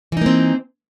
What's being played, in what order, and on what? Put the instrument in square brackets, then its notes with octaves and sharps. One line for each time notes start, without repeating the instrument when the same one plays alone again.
[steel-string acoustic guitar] E3
D#4
A#3
C4